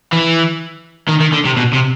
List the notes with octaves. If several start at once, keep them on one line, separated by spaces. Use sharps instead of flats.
E3
D#3
D#3
D3
C3
B2
C3